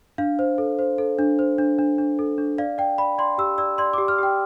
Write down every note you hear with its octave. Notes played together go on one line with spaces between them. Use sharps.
D4 F5
C5
A4
C5
A4
D4
C5
D4
D4
D4
A4
D4
D5 F5
D5 G5
D5 B5
D5 C6
G4 E6
D5 E6
D5 C6
D6
G4
F6
G4 G5